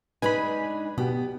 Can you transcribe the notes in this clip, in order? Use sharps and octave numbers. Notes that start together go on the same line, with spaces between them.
G#3 D4 D#4 B4 G#5 B5
B2 B3 G4